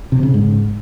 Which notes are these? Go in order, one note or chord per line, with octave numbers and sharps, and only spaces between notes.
C3
C#3
G#2